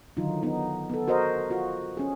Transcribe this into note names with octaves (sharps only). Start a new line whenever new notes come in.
D3 D#3 F#3 D#4 F4
B3 D#4
B3 A4
F#4 A#4 C5 D#5
F4 F#4
C#4 G#4